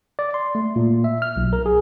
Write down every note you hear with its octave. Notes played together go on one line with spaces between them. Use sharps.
D5
C6
A3
A#2
E5
F6
B1
A#4
G#4